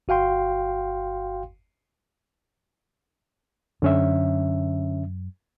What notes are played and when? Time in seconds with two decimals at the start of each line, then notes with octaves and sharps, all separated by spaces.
0.08 G1 F#4 F5 G5 C6
3.82 F#2 D3 C#4 E5